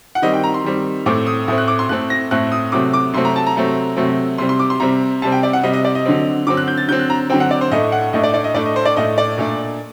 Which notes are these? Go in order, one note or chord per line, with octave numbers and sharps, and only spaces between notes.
F#5
D#3 G3 C4 D#5
G5
A#5
C6
D#3 G3 C4
A2 A3 C4 D6
D#6
A2 A3 C4 D#6
F#6
D6
C6
A2 A3 C4 F#6
A#6
A2 A3 C4 F#6
D#6
C3 F#3 A3 C4 D6
D6
C3 F#3 A3 C4 C6
A#5
A5
A#5
C3 F#3 A3 C4
C3 F#3 A3 C4
C3 G3 C4 C6
C6
D6
C6
C3 G3 C4 A#5
C3 G3 C4 A5
G5
D5
F#5
C3 G3 C4 D#5
D#5
D5
D#5
D3 F#3 C4
D3 F#3 C4 D6
F#6
G6
A6
D3 F#3 C4 G6
F#6
A#5
D3 F#3 C4 G5
F#5
D5
C5
A2 A3 D4 D#5
F#5
A2 A3 D4 D#5
D5
D5
D#5
A2 A3 D4 D5
D#5
C5
D5
A2 A3 D4 D#5
D5
A#2 A3 D4